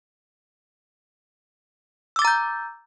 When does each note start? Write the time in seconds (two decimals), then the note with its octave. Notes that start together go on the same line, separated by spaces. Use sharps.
2.16 E6
2.19 D6
2.22 A6
2.25 A#5
2.27 G6